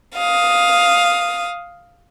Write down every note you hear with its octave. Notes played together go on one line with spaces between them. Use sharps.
F5 D#6